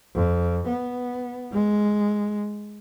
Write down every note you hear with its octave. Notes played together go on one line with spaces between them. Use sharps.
F2
B3
G#3